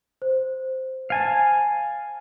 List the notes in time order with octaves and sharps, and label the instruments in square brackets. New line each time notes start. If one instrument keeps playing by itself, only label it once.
[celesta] C5
[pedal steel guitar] F5 G#5 A5